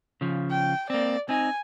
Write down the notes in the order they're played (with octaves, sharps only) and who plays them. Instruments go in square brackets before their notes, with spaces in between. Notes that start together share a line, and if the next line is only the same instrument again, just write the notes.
[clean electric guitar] C#3 F3
[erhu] G5
[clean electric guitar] A#3 C4 [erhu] D5
[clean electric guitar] C4 D#4 [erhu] G#5